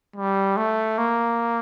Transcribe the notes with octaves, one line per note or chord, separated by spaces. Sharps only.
G3
A3
A#3